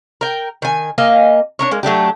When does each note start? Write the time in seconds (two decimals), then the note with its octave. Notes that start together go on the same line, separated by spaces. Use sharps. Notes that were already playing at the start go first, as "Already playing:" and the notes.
0.21 A#4 G5
0.62 D#3 G#5
0.98 A#3 D#5 F5 G#5
1.59 D4 A#4 C#5
1.71 G#3 A#3
1.83 F#3 A3 D4 G4